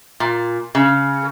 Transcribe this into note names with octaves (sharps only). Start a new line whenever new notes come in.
A#2
C#3